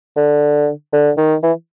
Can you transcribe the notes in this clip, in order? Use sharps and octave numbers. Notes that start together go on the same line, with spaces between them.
D3
D3
D#3
E3